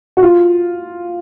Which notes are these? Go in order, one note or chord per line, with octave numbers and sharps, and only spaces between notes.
F#4
F4